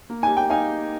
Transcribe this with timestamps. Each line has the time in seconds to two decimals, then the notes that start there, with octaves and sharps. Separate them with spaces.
0.10 A#3
0.23 D#4 G4 G#5
0.37 A#3 G5
0.50 D#4 F5 G#5